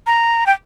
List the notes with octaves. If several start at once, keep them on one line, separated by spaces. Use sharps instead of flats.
A#5
G5